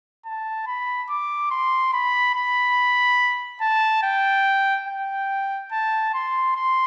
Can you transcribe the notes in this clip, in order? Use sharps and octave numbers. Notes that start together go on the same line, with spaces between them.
A5
B5
D6
C6
B5
B5
A5
G5
G5
A5
C6
C6